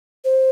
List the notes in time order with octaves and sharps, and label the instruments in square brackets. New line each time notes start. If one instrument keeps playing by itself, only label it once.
[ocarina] C5